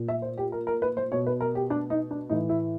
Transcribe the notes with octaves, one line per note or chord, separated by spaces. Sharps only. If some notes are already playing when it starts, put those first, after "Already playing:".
Already playing: A#2
E5
C5
G4
A#4
A#4
B4
C5
B2 C#5
B4
A#4
G4
D4
D#4
D4
A2 E3 D#4
E4